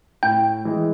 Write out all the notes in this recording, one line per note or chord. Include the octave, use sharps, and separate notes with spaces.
A2 G5
E3 G#3